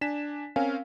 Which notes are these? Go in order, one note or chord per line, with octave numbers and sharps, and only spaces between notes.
D4 G#5 B6 E7
C4 C#4 A#4 F5 G#5